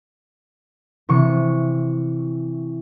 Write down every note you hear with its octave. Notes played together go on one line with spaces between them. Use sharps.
C3 E3 C#6